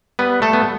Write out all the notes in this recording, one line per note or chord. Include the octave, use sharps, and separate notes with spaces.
G3 B3 B4
A3 A4
B3